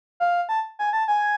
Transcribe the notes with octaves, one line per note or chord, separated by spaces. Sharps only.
F5
A5
G#5
A5
G#5